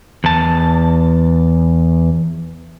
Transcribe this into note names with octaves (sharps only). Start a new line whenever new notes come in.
E2 A5